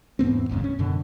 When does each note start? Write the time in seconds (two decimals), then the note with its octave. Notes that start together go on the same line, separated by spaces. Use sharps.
0.19 E2 G#2 B3 C4
0.49 F#1 D#2 G#2 C#3
0.64 C#4
0.79 F#2 B2 D3